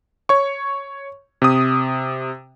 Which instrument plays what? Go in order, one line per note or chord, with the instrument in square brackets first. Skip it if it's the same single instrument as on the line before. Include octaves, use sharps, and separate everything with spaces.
[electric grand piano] C#5 C#6
C3 D#6